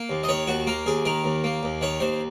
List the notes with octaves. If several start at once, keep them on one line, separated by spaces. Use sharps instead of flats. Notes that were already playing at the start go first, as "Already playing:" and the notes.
Already playing: A#3
D#2
D#5
D#3 C#5
D#2 F#4
A#3 A#4
D#2 G#4
D#3 A#4
D#2
A#3
D#2
D#3 C#5
D#2 C5